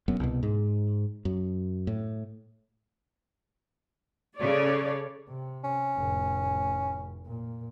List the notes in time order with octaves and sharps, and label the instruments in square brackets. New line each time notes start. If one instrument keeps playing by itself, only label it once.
[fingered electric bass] E1 F#2 B3
C2 B2
G#2
F#2
A2
[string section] C#3 [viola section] A4 C#5 D5
[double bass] C3
[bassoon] C#4
[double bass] F1 A2
A#2